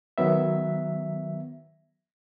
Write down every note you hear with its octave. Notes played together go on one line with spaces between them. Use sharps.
D#3 F#3 B3 E5